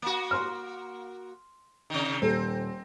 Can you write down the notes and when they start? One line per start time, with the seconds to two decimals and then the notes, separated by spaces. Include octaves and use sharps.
0.02 A#3 F#4
0.31 C6 F6
1.90 C3 D#3
2.22 D#1 C4 A4